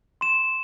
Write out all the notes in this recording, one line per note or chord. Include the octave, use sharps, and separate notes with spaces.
C6 E7